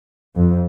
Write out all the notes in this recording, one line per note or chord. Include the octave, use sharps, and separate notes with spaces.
F2